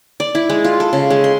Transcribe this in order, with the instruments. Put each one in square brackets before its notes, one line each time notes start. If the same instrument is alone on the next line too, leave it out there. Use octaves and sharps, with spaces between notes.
[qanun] D5
E4
G#3
F4
A4
C#3
G#3
C6